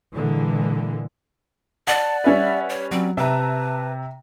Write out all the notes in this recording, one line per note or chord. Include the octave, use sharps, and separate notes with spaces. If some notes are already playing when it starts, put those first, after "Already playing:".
A#2 D3 E3 G#3
D5 F#5 A5
G3 C#4 B4 E5
C#5
F#3 C4 D5
C3 B4 E5 A5 A#5